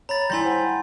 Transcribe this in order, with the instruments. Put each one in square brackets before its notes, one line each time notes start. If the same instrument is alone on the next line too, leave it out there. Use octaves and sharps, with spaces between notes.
[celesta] C#5 [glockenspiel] A#5 B5 A6
[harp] G3 E4 [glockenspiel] G#5 C6 G6 [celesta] A#6
[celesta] C5 F#5 G5